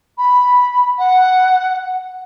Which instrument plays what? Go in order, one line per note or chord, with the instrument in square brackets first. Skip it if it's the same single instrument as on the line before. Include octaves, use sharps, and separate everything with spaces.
[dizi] B5
F#5